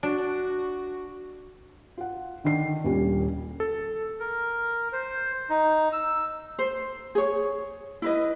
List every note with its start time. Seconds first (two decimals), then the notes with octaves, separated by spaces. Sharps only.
0.03 D4 F#4
1.98 F4 F#5
2.44 D3 D#3 D4 C7
2.84 D#1 A#2 G3 C#4 G4
3.60 A4
4.20 A#4
4.93 C5
5.49 D#4
5.92 E6
6.59 C5
7.15 G#4 C#5
8.02 E4 B4 D#5